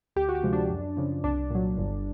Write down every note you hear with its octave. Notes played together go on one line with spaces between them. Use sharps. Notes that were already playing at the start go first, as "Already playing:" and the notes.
D2 G4
F#4
G4
C3 F3 G#3
D4
F#2
C#3 F3
C2 D4
A#2 F#3
G1